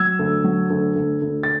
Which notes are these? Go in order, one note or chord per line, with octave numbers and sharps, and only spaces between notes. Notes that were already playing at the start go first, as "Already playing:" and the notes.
Already playing: F#3 E6 G#6
D2
F#3
D2
D2
D2
A6